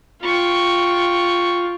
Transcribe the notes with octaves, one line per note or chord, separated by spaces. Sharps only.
F4 G5 C#6